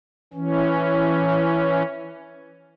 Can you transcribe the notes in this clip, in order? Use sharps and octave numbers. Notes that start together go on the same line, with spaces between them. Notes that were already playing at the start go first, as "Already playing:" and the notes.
E3 C#4